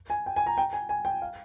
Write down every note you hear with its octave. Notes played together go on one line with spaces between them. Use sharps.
G#5
G5
G#5
A#5
G5
G#5
G#5
G5
F5